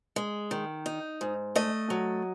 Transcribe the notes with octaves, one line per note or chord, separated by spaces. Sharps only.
G#3
D#3
D#4
G#2
A3 D#5
F#3